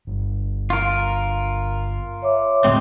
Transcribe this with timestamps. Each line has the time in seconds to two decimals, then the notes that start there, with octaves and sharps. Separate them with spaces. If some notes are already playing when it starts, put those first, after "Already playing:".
0.07 G1
0.70 F4 A#4
2.22 C#5 E5 D6
2.64 D#1 A2 D3 F#3 G#3 C4